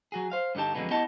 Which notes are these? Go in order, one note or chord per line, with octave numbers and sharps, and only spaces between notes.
F#3 F#4 G#4
C5 F5
G2 D3 D#4 G4 A5
F2 D3 E3 F#3 G#3 B3
B3 E4 G4 D#5 F#5 A5